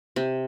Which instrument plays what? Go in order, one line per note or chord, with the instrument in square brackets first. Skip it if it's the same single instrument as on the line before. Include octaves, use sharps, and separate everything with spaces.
[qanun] C3